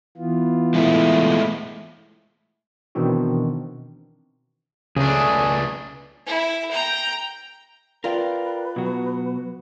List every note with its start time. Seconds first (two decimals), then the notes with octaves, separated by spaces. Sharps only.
0.17 E3 B3 F4
0.74 G#3 A3 E4
2.95 B2 D#3 E3 C4 D4 F#4
4.97 C#2 C#3 A3 D4 G#4
6.27 E4
6.71 G5 A#5
8.04 F4 A#4 B4 D5 G5
8.76 B2 F#3 F#4